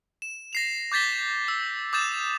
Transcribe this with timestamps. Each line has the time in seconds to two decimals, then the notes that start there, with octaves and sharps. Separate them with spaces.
0.22 E7
0.53 A#6 C7 F7
0.92 D6 G6 A6 B6 G7
1.48 E6
1.93 D6 D#6 G6 A6 E7